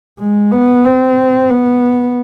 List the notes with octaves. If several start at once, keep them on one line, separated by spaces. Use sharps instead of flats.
G#3
B3
C4
B3